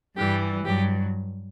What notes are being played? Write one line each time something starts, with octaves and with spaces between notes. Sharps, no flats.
G2 E3 G3 G4
G2 F#3 G4